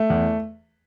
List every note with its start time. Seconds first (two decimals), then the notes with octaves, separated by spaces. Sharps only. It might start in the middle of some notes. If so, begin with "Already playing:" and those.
Already playing: A3
0.10 E2